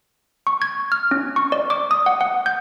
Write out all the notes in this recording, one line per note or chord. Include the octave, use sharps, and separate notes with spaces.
C#6
G#6
F6
C#4
C#6
D5
D6
D#6
F#5
F#5
G6